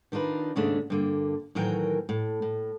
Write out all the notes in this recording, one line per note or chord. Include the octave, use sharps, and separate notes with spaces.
D#3 D4 D#4 F4 B4
D#2 G#2 C#3 A3 D4
G2 D3 A#3
A2 D#3 E3 F#3 A#4 G5
A2
A2